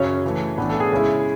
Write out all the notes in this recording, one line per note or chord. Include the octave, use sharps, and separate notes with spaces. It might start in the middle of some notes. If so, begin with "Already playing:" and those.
Already playing: F#2 C#3 F#3 C#4 C#5
C#3 E3 A3
A2 E3 B3 D4
A4
G#4
C#3 G#3 C#4 E4